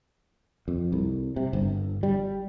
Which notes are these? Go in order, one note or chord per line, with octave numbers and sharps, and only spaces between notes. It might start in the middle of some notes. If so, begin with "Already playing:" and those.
F2
C2
C3
G1
G3